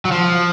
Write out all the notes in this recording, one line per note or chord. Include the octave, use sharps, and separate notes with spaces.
F#3
F3